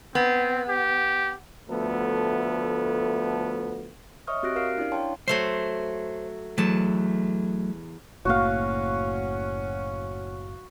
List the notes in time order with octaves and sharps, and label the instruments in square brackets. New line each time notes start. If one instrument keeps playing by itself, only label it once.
[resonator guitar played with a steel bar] B3 [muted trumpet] C4
[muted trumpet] G4
[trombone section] D2 F3 A3 B3 A4
[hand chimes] C#5 D#5 E5 C#6 D#6 F6
C4 F#4 G4 F#6 A#6 D7
G4 A#4 F5 F6 C7 D7
C#4 D4 E4 D5
C#5 F5 G5 A5 C6
[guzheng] F#3 A3 C6 [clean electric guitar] C5
[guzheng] E2 A5 [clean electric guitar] F#3 A3
[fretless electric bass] F#1 A2 A#3 [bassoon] C#4 [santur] F#4 F5